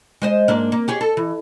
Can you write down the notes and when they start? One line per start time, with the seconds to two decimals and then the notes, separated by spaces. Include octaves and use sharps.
0.22 G#3 C5 D#5
0.48 G#2 A#3 D4
0.72 A#3
0.88 G4 G#4 C#5
1.01 A4
1.17 E3